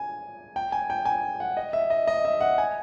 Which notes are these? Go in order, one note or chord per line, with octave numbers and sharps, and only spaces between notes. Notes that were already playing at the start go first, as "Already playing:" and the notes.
Already playing: G#5
G5
G#5
G5
G#5
F#5
D#5
E5
D#5
D#5
E5
F#5
G#5